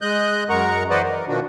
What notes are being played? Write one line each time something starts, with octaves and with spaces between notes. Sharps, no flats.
G#3 D#5 F#6 G6
F#2 G#3 A#4 F#5 A#5 C#6
E3 B4 C5 D5 D#5 F#5
A#4
B2 D#3 F3 D4 F#4